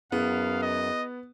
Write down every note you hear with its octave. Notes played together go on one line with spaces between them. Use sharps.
F#2 B3 E4 G#4 F5
D#5